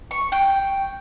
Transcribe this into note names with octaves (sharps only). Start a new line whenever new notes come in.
C#6
G5